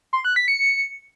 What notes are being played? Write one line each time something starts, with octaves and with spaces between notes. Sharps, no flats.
C6
F#6
B6
C#7